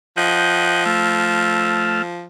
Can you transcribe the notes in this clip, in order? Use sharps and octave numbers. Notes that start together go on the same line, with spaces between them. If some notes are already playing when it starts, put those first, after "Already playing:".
F3 D#5 F#5 G5
A3 E6 F6